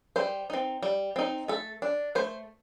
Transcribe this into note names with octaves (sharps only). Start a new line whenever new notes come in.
G3 C5
C4 D#4
G3
C4 D#4
A3 A4
D4
A3 C5